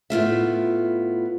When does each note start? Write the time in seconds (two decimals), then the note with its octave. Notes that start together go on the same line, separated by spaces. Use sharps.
0.10 A2 B3 F4 E5